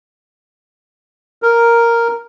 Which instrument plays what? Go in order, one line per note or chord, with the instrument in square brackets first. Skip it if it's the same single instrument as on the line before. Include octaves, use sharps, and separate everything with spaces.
[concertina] A#4